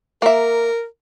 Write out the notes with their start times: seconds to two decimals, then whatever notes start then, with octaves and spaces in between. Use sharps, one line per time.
0.22 A#3 A#4 E5